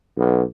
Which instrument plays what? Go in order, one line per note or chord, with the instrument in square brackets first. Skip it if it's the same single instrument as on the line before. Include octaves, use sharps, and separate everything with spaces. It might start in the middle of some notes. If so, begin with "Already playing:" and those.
[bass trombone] B1